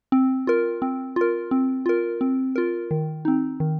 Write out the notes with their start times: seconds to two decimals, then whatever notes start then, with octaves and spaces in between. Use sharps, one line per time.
0.12 C4
0.47 F4 A#4
0.82 C4
1.16 F4 A#4
1.51 C4
1.86 F4 A#4
2.21 C4
2.56 F4 A#4
2.91 D#3
3.25 C4 D#4
3.60 D#3